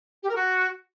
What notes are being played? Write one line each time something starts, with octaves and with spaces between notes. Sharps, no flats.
G4
A#4
F#4